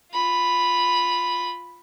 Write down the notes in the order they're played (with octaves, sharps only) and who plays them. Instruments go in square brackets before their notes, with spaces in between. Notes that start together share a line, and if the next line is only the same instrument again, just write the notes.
[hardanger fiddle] F4 B5